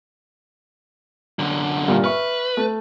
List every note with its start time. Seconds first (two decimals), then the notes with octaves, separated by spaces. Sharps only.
1.39 F#2 D3
1.88 G2 A#2
2.04 B4 E5 C#6 F6
2.57 A3